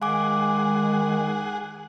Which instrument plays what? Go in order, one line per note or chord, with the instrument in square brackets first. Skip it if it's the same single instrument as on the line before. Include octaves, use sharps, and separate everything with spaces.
[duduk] D#3 [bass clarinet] G#3 [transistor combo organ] G#4 F#5 [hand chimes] F5 G#5 D6